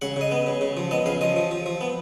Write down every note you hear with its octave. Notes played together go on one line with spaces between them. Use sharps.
C#3 F#5
C#3 D#5
B3
C#3
C#3
F3
B3 D#5
C#3 F5
F3 D#5
F3
F3
F3
B3